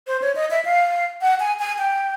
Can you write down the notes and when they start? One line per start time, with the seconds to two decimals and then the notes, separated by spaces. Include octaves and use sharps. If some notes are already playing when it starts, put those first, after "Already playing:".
0.07 C5
0.22 C#5
0.35 D#5
0.51 E5
0.65 F5
1.22 F#5
1.40 G#5
1.59 G#5
1.78 G5